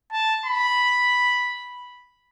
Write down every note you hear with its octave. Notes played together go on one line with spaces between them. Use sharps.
A5
B5